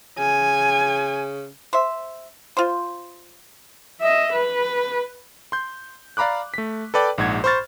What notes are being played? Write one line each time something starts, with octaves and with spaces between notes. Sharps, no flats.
C#3 G#5
C5 E5
F4 C5
D#5 E5
B4
C6 G6
D5 F5 A#5 B5 D6 F#6
A3 B6
A4 B4 D5 G5
A#1 G#2 F#5 G#6
C5 B5 C#6 F6 A6